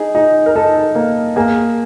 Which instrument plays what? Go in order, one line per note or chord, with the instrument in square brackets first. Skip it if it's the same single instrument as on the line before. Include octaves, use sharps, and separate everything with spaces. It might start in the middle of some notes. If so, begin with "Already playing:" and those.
Already playing: [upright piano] D#4 [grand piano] G#4
[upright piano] D#4
[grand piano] A#4
[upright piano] D#4 [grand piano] A4
[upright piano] A#3
[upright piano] A#3 [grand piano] G#4